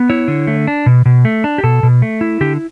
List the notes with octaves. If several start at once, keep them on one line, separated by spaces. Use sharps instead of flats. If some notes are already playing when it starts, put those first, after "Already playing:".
Already playing: B3
E4 C#5
D3
A3
D4
B2
B2
A3
D4
G4
B2 A4
B2
A3
E4
D3 G4